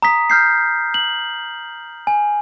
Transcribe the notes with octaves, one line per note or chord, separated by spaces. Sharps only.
A#5 D#6 B6
F6 G6 C7
F#7
G#5